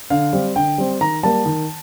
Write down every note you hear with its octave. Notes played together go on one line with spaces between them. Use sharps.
D3 F5
G3 C4
D3 G5
G3 C4
D#3 A#5
G3 A#3 A5
D#3